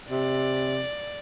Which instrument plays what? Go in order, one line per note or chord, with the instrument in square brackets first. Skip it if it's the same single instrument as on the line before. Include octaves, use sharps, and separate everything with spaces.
[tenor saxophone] C3 [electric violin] D5